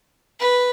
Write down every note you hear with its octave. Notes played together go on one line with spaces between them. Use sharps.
B4